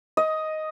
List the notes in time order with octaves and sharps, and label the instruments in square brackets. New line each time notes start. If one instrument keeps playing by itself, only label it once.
[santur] D#5